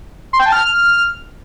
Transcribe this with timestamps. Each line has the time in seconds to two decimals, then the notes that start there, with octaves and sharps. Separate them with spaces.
0.33 C6
0.40 G5
0.46 A5
0.52 F6